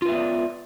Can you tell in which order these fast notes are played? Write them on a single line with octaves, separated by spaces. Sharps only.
F4 B4 E5 B3 D5